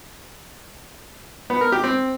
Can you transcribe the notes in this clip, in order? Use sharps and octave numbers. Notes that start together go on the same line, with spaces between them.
B3
A#4
G4
C4